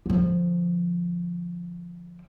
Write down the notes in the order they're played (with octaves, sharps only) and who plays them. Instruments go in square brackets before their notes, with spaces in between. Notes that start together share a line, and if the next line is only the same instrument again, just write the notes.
[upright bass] D3 F3